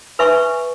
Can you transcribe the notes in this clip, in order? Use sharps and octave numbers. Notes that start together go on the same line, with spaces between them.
B4 E5 G#5 C#6